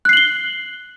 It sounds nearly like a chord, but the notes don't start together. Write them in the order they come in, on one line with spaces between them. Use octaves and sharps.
F#6 C7 F#7 G7